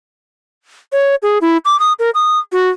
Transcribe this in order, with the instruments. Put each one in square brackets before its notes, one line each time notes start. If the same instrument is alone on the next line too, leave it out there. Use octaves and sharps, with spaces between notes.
[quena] C#5
G#4
E4
D6
D#6
A#4
D#6
F#4